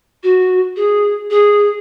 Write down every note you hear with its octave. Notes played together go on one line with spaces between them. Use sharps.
F#4
G#4
G#4